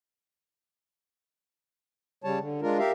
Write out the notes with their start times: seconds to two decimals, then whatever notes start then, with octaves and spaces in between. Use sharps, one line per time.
2.24 C#3 G3 C#5 A5
2.39 D3
2.62 G#3 D4 F4 A#4
2.79 G4 A#4 E5 F5